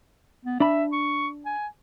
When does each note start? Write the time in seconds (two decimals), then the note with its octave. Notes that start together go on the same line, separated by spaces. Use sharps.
0.45 B3
0.60 D4 E5 B5
0.93 C#6
1.46 G#5